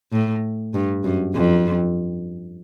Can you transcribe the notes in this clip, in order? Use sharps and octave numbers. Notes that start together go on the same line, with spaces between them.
A2
G2
F#2
F2